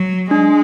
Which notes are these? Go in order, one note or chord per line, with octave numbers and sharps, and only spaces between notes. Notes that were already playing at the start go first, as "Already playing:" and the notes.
Already playing: F#3
G#3 D4